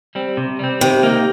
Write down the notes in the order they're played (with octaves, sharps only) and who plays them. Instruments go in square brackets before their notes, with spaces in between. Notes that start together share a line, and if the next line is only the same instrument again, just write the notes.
[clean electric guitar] G3 C4
C3
G3 C4
[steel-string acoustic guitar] C3 [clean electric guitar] D#3
[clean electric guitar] A#3 D#4